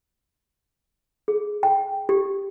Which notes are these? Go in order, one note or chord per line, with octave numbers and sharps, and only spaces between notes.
G#4
G5
G4